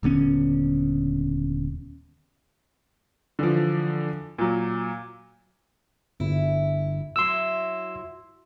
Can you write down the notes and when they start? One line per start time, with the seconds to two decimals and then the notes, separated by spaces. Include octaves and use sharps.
0.03 D#1 D3 B3 C#4
3.39 D3 E3 F3
4.38 A#2 F#3
6.20 G1 E4
7.16 F#3 E4 F#4 C6 E6